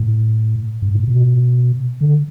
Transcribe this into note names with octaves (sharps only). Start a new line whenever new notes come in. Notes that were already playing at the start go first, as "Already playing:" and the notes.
Already playing: A2
G#2
A2
B2
D3